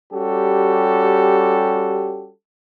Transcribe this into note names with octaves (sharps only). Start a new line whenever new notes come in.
G3 C#4 F#4 G4 A4